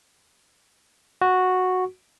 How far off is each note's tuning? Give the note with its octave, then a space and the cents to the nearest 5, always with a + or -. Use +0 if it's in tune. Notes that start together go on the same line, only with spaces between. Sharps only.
F#4 -5